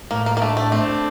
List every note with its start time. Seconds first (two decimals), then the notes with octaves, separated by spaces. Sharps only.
0.11 A2 A#3
0.26 A#3
0.37 A#3
0.41 A3 D4
0.57 A3
0.72 A3 C4